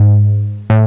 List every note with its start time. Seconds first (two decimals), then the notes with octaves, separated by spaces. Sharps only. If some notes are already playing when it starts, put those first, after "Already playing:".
Already playing: G#2
0.70 A2